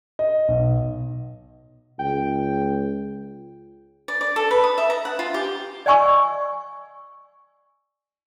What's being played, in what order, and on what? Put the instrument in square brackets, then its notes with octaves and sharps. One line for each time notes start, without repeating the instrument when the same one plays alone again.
[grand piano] D#5
B1
[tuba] C#2 [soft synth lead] G5
[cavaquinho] D5
D5
A4
B4
D#6
E5
A#5
F#5
F4
G4
[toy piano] D5 D#5 F#5 G#5 C#6 E6